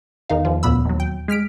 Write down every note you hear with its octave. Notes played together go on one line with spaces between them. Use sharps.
E2 D#3 D#4 F5
E2 F3
D2 A#2 B3 B5 E6
D#2 F#3
G5
G#3 F6 B6 D7